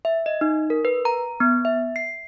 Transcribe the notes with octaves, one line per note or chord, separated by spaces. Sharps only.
E5
D#5
D#4
A#4
B4
A#5
B3
E5
C7